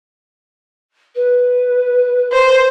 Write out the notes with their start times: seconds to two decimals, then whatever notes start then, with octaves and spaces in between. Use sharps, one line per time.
1.15 B4
2.33 C5